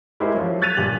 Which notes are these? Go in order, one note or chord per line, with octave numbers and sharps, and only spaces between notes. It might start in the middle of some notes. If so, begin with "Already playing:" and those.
G#3 E4 G4 A#4 C5
F3 F#3
F#6 G#6 A6 B6 D#7 F7
G1 A#2 G4 F#7